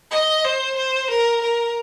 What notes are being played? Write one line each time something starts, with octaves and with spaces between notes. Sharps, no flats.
D#5
C5
C5
A#4
A#4